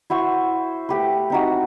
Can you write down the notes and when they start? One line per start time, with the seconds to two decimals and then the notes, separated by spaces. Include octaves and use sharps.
0.10 E4 F#4 C5 C#6
0.89 A3 G4 B4
1.30 C4 D#4 F#4